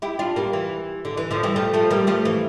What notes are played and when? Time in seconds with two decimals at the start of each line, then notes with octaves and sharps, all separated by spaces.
0.02 E4 G4
0.19 D4 F4
0.36 G3 A#3
0.53 E3
1.05 D3
1.17 E3
1.31 D3 F3
1.43 E3 G3
1.56 F3 A3
1.74 F3 A3
1.90 G3 A#3
2.07 F3 A3
2.25 E3